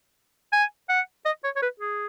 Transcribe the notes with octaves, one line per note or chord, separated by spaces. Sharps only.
G#5
F#5
D#5
C#5
C#5
B4
G#4